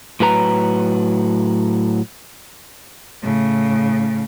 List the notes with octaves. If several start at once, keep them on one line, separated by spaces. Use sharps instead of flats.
A2 F#3 B4 A#5
A2 C#3